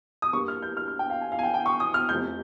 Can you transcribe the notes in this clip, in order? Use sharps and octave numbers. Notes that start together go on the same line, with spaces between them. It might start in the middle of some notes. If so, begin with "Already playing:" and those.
D#6
G2 G3 A#3 C#6
F6
G6
F6
F6
G5
F5
G#5
F5
G#5
G5
G5
C#6
D#6
F6
F1 F2 C3 G6